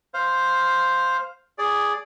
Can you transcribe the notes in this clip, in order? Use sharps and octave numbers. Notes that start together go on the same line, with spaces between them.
C5 F5
G#4 D5